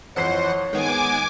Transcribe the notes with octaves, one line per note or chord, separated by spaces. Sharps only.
F2 E3 C5 C#5 F#5 C7
D#3 G#3 B3 G#5 D6